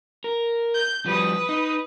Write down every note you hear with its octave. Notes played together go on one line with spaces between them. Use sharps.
A#4
G6
F3 G3 B4 D#6
D#4